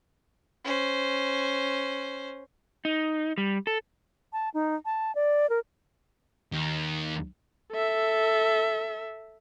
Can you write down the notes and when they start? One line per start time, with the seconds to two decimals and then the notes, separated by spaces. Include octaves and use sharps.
0.65 C#4 C5
2.85 D#4
3.38 G3
3.67 A4
4.33 A5
4.54 D#4
4.85 A5
5.15 D5
5.50 A#4
6.52 D#2 D#3
7.73 A4 E5